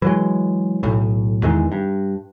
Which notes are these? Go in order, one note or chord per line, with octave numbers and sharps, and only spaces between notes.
E3 F#3 G#3
B1 A2
E2 D#3 E3 G#3
G2